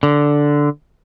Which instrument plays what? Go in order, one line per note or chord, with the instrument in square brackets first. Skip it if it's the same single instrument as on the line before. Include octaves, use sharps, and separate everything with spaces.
[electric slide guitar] D3